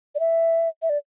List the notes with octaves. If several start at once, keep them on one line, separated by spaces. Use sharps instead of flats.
D5
E5
E5
D5